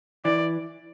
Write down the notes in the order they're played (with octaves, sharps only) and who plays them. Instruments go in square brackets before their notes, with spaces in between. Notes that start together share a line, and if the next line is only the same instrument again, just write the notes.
[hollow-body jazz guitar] E3 [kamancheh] D5